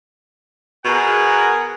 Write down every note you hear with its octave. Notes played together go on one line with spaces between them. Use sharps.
B2 G#4 A#4 F#5